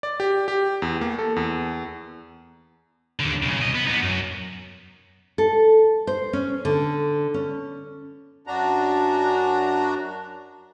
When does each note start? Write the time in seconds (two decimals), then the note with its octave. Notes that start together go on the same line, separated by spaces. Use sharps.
0.03 D5
0.20 G4
0.48 G4
0.82 E2
1.01 A#3
1.19 A4
1.36 E2
3.20 D#2 D3
3.42 B1 C#3
3.60 C2 D#5
3.75 B3
3.87 B3 D#4
4.03 F#2
5.38 A4
6.07 C5
6.33 C#4
6.65 D3
7.34 C#4
8.47 F#2 D4 F#4 A#5